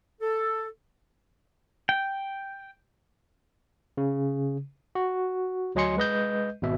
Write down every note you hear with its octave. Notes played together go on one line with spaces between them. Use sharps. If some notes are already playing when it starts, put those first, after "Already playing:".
A4
G5
C#3
F#4
D2 F#3 D#5 G#5 C6 C#7
G#3 B4 D#5 G6
G#1 B2 E5